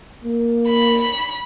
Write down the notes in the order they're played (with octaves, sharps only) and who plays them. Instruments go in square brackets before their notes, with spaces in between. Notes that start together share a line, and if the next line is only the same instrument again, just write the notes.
[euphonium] A#3
[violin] B5